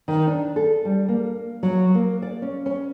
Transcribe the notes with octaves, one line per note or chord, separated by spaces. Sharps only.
D#3
D4
A4
G3
A#3
F#3
A#3
D5
C#4
C#4